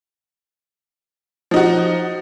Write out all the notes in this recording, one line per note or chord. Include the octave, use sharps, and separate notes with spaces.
F3 D#4 F#4